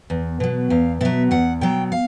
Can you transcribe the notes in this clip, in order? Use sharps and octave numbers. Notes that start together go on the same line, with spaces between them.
E2
B2 F#3
E2 F5
B2 F#3 E5
E2 F#5
B2 F#3 G5
F5